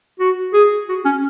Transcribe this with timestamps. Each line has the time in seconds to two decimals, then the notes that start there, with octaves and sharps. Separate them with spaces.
0.20 F#4
0.54 G#4
0.89 F#4
1.05 C#4